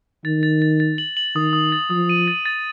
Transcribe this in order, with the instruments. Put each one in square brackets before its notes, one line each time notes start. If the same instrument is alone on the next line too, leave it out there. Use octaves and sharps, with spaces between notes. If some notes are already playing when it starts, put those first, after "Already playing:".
[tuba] D#3 [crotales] A6
[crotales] A6
A6
A6
F#7
F#7
[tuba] D#3 [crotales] D#6
[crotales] D#6
A6
[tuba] F3 [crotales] D#6
[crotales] D#7
A6
A6